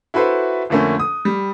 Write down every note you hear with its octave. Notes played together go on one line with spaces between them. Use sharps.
E4 F#4 A4 B4 C5 E5
F2 D3 A3 A#3 C#4
D#6
G3